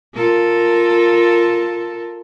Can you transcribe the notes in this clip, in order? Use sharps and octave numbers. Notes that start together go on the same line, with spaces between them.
F4 A4 A#4